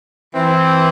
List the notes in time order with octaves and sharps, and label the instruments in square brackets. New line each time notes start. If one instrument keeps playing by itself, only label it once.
[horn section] E3 [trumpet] C4